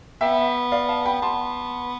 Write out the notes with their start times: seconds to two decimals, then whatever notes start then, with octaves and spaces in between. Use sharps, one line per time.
0.21 B3 E5 G5
0.72 D5 F5
0.89 F5 A5
1.05 G5 B5
1.22 B3 A5 C6